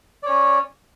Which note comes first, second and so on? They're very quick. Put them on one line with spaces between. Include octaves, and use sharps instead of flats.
D5 C#5 C#4